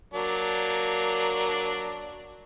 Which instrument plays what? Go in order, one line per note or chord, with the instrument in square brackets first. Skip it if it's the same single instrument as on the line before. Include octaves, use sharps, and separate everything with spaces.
[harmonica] F#3 A#3 D4